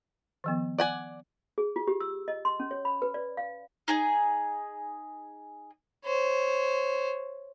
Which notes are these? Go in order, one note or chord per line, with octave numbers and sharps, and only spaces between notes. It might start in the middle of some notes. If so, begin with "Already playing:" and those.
D#3 F3 B3
D5 F#5 G#5
G#4
F4
G4
E6
D#5
C6
C#4
C#5
B5
B4
D5
F5
D#4 G#4 G#5
C5 C#5